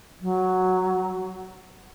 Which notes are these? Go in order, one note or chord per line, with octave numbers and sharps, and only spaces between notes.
F#3